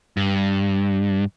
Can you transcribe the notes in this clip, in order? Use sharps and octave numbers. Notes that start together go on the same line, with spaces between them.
G2